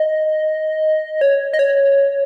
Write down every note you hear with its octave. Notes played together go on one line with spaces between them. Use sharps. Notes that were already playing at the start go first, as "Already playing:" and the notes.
Already playing: D#5
C#5
D#5
C#5